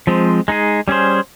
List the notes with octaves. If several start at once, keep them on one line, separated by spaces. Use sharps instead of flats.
F3 G#3 C4
G#3 D#4 G#4
G3 C#4 G#4 C5